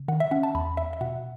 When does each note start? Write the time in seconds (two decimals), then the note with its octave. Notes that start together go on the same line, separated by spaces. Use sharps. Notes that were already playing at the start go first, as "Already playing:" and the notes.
Already playing: C#3
0.08 D#3 F#5
0.20 E5
0.31 C#4 F#5
0.43 A5
0.54 E2 B5
0.77 E2 E5
0.93 E5
1.01 B2 F#5